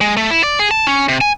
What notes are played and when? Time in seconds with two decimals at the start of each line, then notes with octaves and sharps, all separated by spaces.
0.01 G#3
0.17 A3
0.30 E4
0.44 D5
0.59 G#4
0.71 A5
0.87 C#4
1.09 C3
1.21 G#5